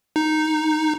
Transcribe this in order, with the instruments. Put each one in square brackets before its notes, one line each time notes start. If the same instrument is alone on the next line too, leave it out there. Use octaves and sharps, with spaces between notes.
[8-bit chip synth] D#4